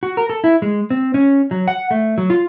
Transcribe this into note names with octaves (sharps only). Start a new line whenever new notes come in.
F#4
A#4
A4
E4
G#3
C4
C#4
F#3
F#5
A3
F#3
F4